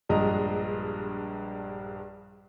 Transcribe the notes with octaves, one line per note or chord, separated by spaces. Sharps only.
A#1 G2 G#3 D#5 A#5